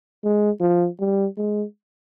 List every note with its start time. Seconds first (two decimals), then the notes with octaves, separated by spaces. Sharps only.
0.24 G#3
0.60 F3
1.00 G3
1.37 G#3